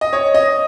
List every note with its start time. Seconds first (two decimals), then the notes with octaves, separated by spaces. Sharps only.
0.01 D#5
0.13 C#5
0.34 D#5